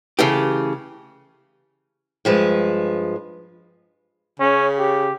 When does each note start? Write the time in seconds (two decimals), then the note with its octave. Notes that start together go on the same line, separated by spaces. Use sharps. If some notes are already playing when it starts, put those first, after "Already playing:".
0.19 C#3 E3 A3 G4
2.25 G2 F3 G#3 B4
4.40 C#3 C#4
4.78 G4